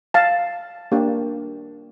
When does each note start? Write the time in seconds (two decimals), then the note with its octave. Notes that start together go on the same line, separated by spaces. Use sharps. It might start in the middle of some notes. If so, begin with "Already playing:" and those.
0.14 F5 A5
0.92 A#3 D4 G4